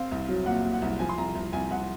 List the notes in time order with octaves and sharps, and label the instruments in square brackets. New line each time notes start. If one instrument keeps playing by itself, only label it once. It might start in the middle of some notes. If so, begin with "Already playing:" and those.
Already playing: [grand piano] C4 F5
C2
F#3
A#2 F#5
A#2
F#5
C2
F3 G#5
C6
C2 A#5
C2
C2 G#5
C2 F#5